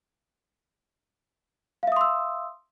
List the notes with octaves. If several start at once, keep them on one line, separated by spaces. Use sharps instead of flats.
E5 F5 C6 D#6 E6